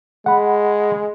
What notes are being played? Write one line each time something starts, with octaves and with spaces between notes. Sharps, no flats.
G#3 F#5 B5